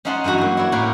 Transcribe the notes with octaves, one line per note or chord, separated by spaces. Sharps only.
C#4 D#4 F5 F#5 A5 C6
G2 E3 F#3 F#4 A#5
F#3 A#3
E4 C#5 D5
A2 A3 A#3 A#4 B4 F5